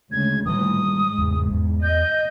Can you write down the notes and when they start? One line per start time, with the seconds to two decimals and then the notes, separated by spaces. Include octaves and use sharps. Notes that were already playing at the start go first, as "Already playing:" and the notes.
0.12 D2 C#3 G#3 G#6
0.46 A2 D#3 E3 G3 D#6
0.78 G#2
1.18 A1 E2
1.51 E2
1.83 D#5 G6